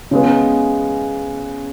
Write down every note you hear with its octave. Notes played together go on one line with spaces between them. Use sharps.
C#3 G#3 B3